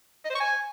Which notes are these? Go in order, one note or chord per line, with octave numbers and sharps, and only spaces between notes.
D#5
C5
C#6
G#5